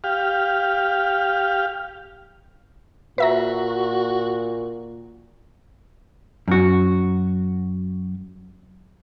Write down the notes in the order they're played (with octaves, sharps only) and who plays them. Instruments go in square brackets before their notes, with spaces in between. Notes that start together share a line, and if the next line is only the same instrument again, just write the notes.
[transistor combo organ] G4 F5
[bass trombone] A#2 [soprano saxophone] F#4 [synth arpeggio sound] B4 E5 A#5
[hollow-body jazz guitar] F#2 F#4